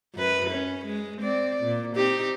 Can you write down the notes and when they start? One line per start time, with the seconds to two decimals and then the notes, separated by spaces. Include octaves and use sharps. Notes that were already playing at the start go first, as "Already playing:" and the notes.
0.15 F#2 B4
0.51 C#4
0.86 G#3
1.22 C4 D5
1.63 A#2
1.96 C4 D#4 G4